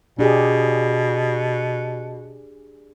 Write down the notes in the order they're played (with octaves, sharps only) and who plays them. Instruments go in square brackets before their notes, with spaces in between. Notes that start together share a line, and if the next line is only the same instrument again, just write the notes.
[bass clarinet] B2 [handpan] D4 G4 G#4